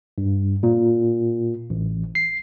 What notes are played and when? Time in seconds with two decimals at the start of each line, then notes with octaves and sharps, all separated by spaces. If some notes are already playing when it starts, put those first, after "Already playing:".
0.18 G2
0.63 A#2
1.70 A1
2.15 C7